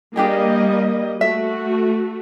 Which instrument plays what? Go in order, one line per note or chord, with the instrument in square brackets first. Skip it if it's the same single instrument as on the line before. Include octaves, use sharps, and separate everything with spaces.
[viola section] G3 A#3 D#5 [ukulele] D4 G4 G#4
[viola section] A3 F#4 [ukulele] E5